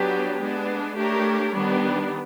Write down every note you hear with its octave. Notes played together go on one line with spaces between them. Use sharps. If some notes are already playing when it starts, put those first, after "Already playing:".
Already playing: F#3 B3 D4 G4
G#3 B3 D4
A3 D4 G4 A#4 C#5
D#3 G3 B3 D4